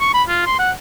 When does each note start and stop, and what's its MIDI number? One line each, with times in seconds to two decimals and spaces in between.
0.01 0.12 85
0.14 0.23 83
0.28 0.41 65
0.46 0.58 84
0.59 0.71 78